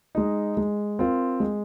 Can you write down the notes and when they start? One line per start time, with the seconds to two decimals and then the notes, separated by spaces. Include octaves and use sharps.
0.15 G#3 D#4
0.57 G#3
0.99 C4 F4 A#4
1.40 G#3